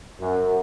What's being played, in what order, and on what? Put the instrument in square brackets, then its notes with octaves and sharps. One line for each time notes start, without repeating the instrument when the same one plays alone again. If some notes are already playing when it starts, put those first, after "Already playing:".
[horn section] F#2